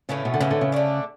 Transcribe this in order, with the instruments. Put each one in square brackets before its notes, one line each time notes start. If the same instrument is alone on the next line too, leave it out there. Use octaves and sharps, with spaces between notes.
[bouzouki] A2 E3 A3 C#4 [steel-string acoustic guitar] C#3
[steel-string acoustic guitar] B2
D3
[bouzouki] A2 E3 A3 [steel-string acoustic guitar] C#3
[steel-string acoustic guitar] D3
C#3
[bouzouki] D3 A3 D4